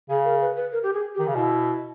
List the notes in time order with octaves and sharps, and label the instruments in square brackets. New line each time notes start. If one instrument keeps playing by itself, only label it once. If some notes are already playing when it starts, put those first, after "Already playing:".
[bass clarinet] C#3 [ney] G#4
[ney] A#4
B4
B4
A#4
G4
G#4
G4
[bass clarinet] D#3
C#3
[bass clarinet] B2 [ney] E4